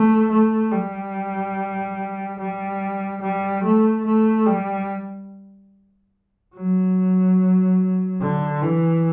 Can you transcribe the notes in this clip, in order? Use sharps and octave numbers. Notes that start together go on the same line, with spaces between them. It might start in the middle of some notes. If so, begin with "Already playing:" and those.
Already playing: A3
A3
G3
G3
G3
A3
A3
G3
F#3
D3
E3